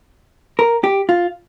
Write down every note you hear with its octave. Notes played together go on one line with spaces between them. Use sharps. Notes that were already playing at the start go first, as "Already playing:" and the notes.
A#4
G4
F4